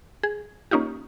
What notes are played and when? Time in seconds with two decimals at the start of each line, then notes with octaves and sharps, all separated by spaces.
0.23 G#4
0.71 A#3 C#4 D#4 F4 G4